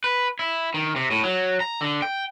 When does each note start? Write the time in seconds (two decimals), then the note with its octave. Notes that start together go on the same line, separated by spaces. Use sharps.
0.04 B4
0.39 E4
0.74 D#3
0.96 C3
1.11 A2
1.24 F#3
1.60 A#5
1.81 D3
2.02 G5